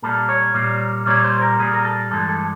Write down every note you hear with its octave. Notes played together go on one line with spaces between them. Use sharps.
A#2 G3 A#3 A4
C#5
A#2 G3 A#3
A#2 G3 A#3 C#5
C5
A#4
A#2 G3 A#3 G#4
A#4
A4
G2 E3 G#3 A4
A4